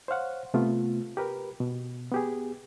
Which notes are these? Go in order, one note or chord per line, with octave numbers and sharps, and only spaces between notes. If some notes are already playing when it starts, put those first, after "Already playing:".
C5 C#5 F5 F#5
C3 A3 B3 F4
G4 A#4 B4
B2
B3 G4 G#4